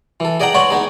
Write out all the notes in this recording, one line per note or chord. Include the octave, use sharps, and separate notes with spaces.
E3 A4
G#4 D5 D#5 F#5 G5 A#5
B4 C#5 D5 F#5 C6 C#6
B3 D#4 G#4